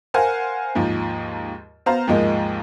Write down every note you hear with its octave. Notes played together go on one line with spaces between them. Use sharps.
A#4 C5 F5 F#5 G#5
D#2 G#2 F3
B3 C5 F5 A#5
D#2 G#2 F3 G#3 A#3